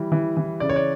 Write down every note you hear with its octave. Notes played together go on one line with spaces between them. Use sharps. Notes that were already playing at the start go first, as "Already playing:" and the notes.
Already playing: E3 G3
E3
E3
C#3 D5
C#5
D5